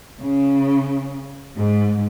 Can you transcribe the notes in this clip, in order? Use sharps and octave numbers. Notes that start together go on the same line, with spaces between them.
C#3
G#2